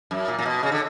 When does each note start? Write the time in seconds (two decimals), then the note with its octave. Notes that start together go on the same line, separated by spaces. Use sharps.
0.11 F#2
0.28 A#2
0.39 A#2
0.46 B2
0.63 C#3
0.72 D3